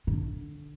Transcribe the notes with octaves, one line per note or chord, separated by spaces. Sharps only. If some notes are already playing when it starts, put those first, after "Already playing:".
C3
D3